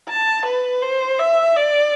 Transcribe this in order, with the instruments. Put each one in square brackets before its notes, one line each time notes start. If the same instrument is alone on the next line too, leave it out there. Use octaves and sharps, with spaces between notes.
[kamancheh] A5
B4
C5
E5
D5